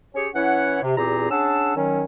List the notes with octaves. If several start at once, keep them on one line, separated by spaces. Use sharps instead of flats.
C#4 G4 G#4 C#5
E3 C#4 E4 C#5 F#5
C3
E2 A#2 C4 G4 G#4 A#5
C#4 D4 G#4 F#5 A5 E6
D#3 F#3 C#4